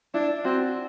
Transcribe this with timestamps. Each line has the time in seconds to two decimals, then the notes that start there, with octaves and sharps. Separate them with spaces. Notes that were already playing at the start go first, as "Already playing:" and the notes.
0.14 D4 E4
0.44 C4 F#4